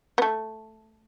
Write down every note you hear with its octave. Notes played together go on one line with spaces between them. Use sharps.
B3
A3